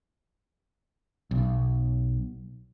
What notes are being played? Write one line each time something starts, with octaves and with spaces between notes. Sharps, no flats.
B1